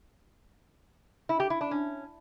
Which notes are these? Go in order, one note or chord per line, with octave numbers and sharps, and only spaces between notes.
E4
G4
E4
D4
C#4